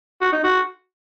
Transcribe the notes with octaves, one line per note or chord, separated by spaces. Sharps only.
F#4
D#4
F#4